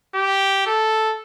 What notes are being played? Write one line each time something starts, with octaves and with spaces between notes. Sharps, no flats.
G4
A4